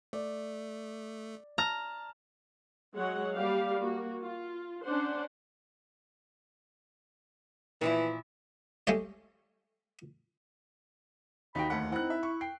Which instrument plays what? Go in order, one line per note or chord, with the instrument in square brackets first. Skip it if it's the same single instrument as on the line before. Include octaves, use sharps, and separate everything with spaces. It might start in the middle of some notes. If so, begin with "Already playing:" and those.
[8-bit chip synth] A3 [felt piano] D5
[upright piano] A5 F6 [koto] A#5
[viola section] F#3 G#3 C#5 F#5
G3 A#3 G4 D5 F5
A#3 F#4
F4
C#4 D4 C5 F#5 C6
[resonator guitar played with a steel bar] A#2 F3 E4 [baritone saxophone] E3
[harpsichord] G#3 A3 G4 C#5 D5
[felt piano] D#2 [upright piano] D#4 F#4 G5 [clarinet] B5
[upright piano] F1 D2 F#5
[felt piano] C4 D#4 [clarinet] E4 [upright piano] F#5 F#6
[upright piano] E5
[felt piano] C#6
[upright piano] G5 [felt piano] C7